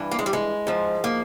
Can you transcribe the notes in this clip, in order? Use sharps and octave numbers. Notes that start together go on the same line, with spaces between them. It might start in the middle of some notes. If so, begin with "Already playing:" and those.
Already playing: G2 E3
A#3
G#3
G3
G#3
G#2 F3
A#3